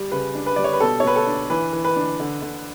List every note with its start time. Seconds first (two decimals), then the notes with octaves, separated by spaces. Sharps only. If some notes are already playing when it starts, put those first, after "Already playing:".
Already playing: G3
0.11 C#3 B4
0.35 D4
0.46 B4
0.56 G3 D5
0.64 C#5
0.73 B4
0.80 B2 A4
1.00 C#5
1.04 B2 B4
1.16 A4
1.27 D4
1.50 E3 B4
1.73 E3
1.84 B4
1.96 D4
2.20 D3
2.42 D3